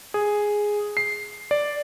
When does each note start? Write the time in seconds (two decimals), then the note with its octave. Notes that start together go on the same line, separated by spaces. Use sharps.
0.14 G#4
0.97 C7
1.51 D5